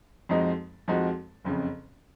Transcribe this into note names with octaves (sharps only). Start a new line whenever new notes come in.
F2 F3 G#3 D#4 F#4
F2 F3 G#3 D#4 F#4
F#1 F2 C#3